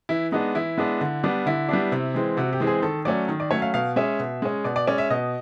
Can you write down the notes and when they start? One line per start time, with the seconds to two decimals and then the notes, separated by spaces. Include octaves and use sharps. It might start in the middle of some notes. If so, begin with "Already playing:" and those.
0.09 E3 E4
0.32 G#3 B3 D4 D#4
0.55 E3 E4
0.77 G#3 B3 D4
1.01 D3
1.23 G3 B3 D4
1.46 D3 E4
1.69 G3 B3 D4
1.92 C3
2.14 E3 G#3 C4
2.37 C3 F#4
2.53 G4
2.60 E3 G#3 C4
2.67 G#4
2.82 D#3 A4
3.05 F#3 A3 C#4 D5
3.28 D#3
3.40 D5
3.51 F#3 A3 C#4 C#5
3.62 F5
3.74 B2 F5
3.96 G#3 C#4 E5
4.20 B2
4.42 G#3 C#4
4.64 B2 D5
4.76 D5
4.87 G#3 C#4 D5
4.98 E5
5.10 B2 D#5